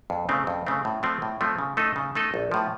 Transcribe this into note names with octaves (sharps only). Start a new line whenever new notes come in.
F2
C#3 A3 C4
F2
C#3 A3 C4
A2
F3 A3 C4
A2
F3 A3 C4
C#3
A3 D#4 A4 D#5
C#3
A3 D#4 A4 D#5
A#1
A2 F3